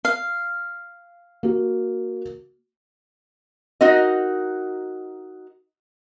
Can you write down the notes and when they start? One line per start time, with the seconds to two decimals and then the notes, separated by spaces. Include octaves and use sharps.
0.05 F5
1.43 A#3 F#4
3.81 D#4 F#4 A#4 D#5